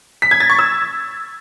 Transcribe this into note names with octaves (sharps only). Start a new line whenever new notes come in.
B6
G#6
A6
C#6
E6